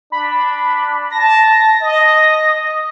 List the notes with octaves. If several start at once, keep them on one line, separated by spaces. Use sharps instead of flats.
D4 B5
A5 A#6
D#5